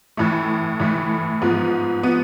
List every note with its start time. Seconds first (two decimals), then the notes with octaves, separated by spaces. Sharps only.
0.17 A2 E3 A3
0.80 A2 E3 A3
1.42 G#2 F3 B3
2.03 F3 B3